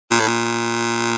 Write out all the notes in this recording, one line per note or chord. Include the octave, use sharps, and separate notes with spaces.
A#2
A2
A#2